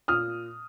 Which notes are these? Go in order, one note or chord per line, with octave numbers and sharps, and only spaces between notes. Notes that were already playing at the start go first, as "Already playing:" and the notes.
A#2 D#6 F6